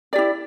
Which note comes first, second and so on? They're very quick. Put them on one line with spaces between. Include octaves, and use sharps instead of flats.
D5 G4 E4